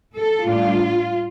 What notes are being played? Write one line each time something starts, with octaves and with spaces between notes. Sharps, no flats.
A4
A2 G3 D4 F4